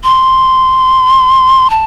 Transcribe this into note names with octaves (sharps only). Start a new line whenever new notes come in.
C6
A5